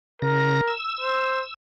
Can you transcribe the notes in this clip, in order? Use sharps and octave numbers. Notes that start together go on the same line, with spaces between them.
C#3 A#4 A#6
E6
C5